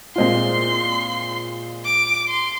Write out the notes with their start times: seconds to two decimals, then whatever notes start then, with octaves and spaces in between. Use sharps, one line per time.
0.16 A#2 G#3 C4 F4 C6
1.85 D6
2.28 C6